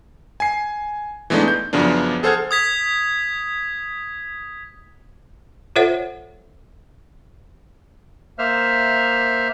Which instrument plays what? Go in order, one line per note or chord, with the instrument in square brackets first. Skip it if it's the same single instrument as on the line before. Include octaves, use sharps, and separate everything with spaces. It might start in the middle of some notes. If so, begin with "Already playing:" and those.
[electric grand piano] G#5 C7
E3 G#3 A3 B3 D4 D#4
G6
F#2 C#3 F3 B3 D4
G#4 A4 C5 F#5 F6 G#6
[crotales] D#6 G#6 B6
[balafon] F4 A4 C5 C#5 E5 F#5
[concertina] A#3 C5 E5 F6